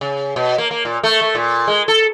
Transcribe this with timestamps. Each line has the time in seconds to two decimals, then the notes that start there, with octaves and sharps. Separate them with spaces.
0.01 C#3
0.36 B2
0.58 A#3
0.71 A#3
0.85 A#2
1.03 A3
1.21 A3
1.35 A#2
1.68 G#3
1.88 A4